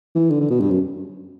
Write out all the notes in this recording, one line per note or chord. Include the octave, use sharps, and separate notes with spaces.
E3
D3
D3
B2
G2
F#2